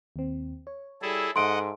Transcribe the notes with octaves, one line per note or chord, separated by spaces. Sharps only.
D#2 C4
C#5
G3 E4 G#4 A4
G#2 A4 D#5 E5 F#5 C6 D7